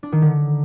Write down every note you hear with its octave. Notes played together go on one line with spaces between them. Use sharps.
D4
D#3
D3